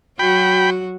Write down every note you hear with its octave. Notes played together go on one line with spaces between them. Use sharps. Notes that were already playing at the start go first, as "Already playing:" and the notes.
F#3 F#4 G5 B5